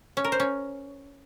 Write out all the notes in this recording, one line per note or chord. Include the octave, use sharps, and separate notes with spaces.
C#4
A#4
C5
C#4